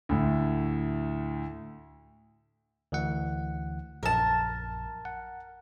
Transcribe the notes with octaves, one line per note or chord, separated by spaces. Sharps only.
D2 A2
D2 E3 F#5
A#1 F#2 A#4 A5
F#5